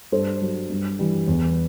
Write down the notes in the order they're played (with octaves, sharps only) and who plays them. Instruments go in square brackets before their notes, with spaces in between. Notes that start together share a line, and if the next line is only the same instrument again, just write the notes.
[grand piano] G2 A4 C5
F#3
G2
E3 G3
E2